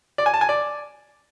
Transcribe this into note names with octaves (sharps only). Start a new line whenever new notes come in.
D5
G#5
A5
G#5
D5